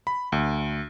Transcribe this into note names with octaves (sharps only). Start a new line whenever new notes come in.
B5
D2